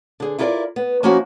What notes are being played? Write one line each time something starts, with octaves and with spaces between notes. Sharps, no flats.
D3 G#4
E4 F4 G4 A4 A#4 D5
B3
F3 A#3 C#4 D#4 E4 F#4